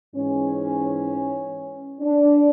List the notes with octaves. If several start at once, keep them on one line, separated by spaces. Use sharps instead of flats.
G#2 E3 C#4
D4